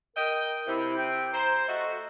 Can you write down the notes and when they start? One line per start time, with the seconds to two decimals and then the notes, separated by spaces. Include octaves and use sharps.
0.17 A#4 D#5 G5
0.67 C3 E4
0.98 G5
1.33 C5 A#5
1.68 A3 F#4 D#5